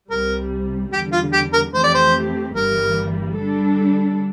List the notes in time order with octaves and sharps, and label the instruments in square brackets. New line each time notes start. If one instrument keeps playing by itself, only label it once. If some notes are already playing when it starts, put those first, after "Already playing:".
[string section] C2 C3 G3 [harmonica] A#4
[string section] E2 D3 G3 [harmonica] G4
[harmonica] F4
G4
A#4
[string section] F2 E3 A3 C4 G4 [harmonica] C5
[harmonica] D5
C5
[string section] G1 G2 E3 G3 A#3 [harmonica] A#4
[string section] D3 G3 D4 A4